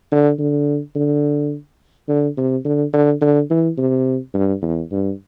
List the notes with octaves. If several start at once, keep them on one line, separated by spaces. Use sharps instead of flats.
D3
D3
D3
D3
C3
D3
D3
D3
E3
C3
G2
E2
G2